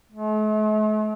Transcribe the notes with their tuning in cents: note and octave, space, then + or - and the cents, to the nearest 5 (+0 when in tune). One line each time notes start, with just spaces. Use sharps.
A3 -45